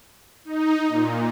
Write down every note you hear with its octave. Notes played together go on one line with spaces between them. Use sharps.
D#4
A#2